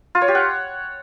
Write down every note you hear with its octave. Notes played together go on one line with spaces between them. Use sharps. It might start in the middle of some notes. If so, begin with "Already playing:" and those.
F4
C#5
G4
F#5